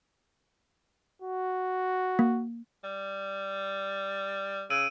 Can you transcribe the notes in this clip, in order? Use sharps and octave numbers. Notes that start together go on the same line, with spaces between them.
F#4
A#3
G3
C#3 E6 D7 D#7